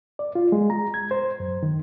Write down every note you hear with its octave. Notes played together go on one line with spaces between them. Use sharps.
D5
F4
G#3
A#5
G#6
C5
F#2
D#3